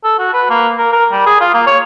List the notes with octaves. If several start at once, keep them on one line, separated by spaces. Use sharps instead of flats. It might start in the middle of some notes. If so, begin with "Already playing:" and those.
A4
F#4
B4
A#3
A#4
A#4
G3
G#4
F4
A#3
C#5